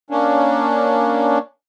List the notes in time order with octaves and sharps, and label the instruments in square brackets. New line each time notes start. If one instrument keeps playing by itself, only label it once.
[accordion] A#3 C#4 D4